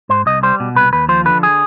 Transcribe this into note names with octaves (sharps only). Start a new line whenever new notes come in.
G#2 C5
C2 D#5
G3 C5
B2
C2 B4
D#2 B4
F3 C5
D3 B4
G#4